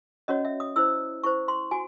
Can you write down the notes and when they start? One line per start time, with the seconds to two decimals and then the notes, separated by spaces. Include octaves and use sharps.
0.28 C#4 F#4 C#5 D#5
0.45 E5
0.60 D#6
0.76 E4 C5 E6
1.23 E4 C5 C#6
1.48 C6
1.71 F#4 G#5